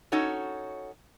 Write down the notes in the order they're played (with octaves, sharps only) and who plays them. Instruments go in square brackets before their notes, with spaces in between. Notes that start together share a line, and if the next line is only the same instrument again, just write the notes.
[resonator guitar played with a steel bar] C#4 D#4 F#4 A4 C#5